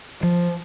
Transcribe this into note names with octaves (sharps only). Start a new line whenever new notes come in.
F3